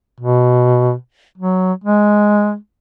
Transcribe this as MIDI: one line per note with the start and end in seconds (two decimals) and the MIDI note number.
0.20 0.94 47
1.38 1.73 54
1.84 2.56 56